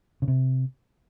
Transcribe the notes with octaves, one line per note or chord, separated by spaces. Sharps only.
C#3
C3